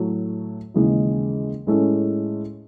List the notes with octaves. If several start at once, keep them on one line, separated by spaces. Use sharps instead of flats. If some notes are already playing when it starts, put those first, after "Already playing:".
Already playing: A2 F#3 A3
D#2 C#3 E3 G#3 D#4
A2 G#3 C#4 E4 A4